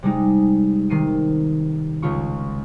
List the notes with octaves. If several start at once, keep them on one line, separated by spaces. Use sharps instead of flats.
C3 G3 G#3 D#4
C3 D#3 C7 D#7
C#2 C#3 F4 C#6